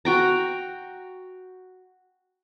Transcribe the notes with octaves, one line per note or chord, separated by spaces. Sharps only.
F#4 G5 A#5